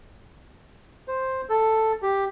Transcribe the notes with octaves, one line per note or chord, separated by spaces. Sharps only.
C5
A4
G4